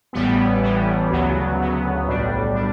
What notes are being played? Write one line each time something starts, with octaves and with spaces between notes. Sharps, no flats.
A1 A2 E3 G3 B3
A1 A2 E3 G3 B3
D2 C#3 F#3 B3
D2 C#3 F#3 B3
B1 A2 G3 D4
A2 G3 D4